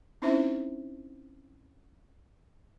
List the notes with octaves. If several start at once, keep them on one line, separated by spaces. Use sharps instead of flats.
C4 C#4 D#4 E4 C5 E5